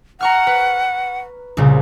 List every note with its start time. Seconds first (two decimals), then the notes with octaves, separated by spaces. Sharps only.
0.21 F#5 A#5 C#6 F6
0.47 B4
1.57 C2 A#2 C#3